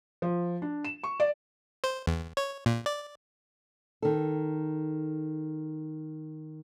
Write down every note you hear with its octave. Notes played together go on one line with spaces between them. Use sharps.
F3
D4
E7
C#6
D5
C5
E2
C#5
A#2
D5
D#3 A4